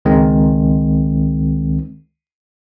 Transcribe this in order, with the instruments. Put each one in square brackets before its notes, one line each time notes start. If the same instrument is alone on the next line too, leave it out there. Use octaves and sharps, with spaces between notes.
[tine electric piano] C#2 D#3 G#3 C4